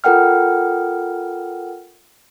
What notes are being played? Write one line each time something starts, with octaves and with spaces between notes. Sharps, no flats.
F4 A4 A#4 F#5 G5 F6